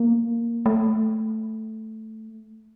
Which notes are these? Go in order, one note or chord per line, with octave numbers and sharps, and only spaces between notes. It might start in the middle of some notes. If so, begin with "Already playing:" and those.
Already playing: A#3
A3